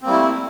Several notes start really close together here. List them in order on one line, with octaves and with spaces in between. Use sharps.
C4 A#3 G3 E4 A3